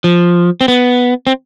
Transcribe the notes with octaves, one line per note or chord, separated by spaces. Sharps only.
F3
C4
B3
C4